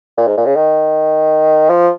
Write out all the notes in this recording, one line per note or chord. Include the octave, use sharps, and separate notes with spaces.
A#2
G#2
A#2
C#3
D#3
F3